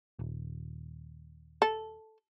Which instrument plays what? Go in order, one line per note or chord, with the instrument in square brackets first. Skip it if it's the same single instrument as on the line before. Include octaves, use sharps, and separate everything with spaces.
[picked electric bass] D#1
[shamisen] A4